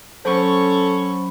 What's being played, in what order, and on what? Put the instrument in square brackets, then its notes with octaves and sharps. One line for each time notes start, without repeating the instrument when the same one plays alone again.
[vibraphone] F#3 B5 [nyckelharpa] C#4 C#6 [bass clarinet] A4 [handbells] C5